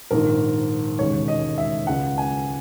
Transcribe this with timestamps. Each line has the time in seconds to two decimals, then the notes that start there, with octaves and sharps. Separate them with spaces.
0.11 A#1 G#2 D#3 A#4
0.99 E1 D#2 C#3 G#3 C#5
1.28 D#5
1.58 E5
1.87 C#2 C#3 G#3 F#5
2.18 G#5